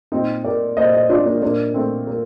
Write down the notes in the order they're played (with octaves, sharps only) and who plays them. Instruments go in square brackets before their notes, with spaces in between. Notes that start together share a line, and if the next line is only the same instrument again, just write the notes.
[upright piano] A#2 C4 D#4
A#4 D5
A#2 C5 D#5
C5 D#5
D4 F4
A#3 D4
A#2 A#3 D4
A3 C4
A#2 A#3